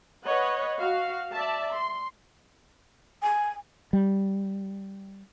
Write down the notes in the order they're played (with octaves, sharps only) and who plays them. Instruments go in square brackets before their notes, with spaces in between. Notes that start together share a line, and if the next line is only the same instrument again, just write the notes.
[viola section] B4 C#5 D#5 F#5
F#4 F5
D5 E5 A5
C6
[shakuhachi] G#5
[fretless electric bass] G3